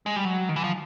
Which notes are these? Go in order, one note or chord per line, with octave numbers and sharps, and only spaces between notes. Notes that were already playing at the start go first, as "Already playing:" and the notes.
G#3
G3
F#3
D#3
E3
F3